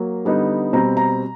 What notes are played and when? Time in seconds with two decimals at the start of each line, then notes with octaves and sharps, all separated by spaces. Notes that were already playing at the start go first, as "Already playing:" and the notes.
Already playing: F#3 A#3
0.25 D3 G3 B3 D#4
0.73 B2 G3 C4 A#5
0.97 A#5